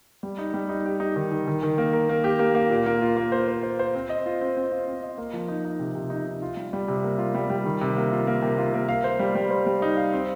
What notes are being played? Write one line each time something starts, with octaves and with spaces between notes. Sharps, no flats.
G3
D#4
G3
D#4
G4
D#4
D#3
D#3
D#3
D#3
A#3
A#4
A#3
G4
A#3
A#3
A#2
A#3
F4
A#3
C5
C5
C5
C5
C4
D#5
F4
C4
C4
F4
C4
D#5
A#3
F3
D#4
D#4
C3
C3
D#4
D#4
F4
G3
G3
C3
A#3
F4
G3
G3
D#3
C3
A#3
F4
A#3
C3
F4
A#3
F5
C5
G3
G3
C5
G3
D#4
F5
C4